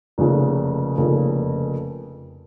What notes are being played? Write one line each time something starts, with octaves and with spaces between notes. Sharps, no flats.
F1 F2 C#3 F3 A#3
F1 F2 C#3 F3 A#3